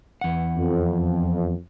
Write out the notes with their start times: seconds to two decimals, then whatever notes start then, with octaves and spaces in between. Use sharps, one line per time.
0.21 E2 F#5
0.57 F2